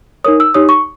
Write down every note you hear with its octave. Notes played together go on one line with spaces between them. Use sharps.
D#4 A#4 C#5 D#6
E6
D#4 G4 C#5 D#6
C#6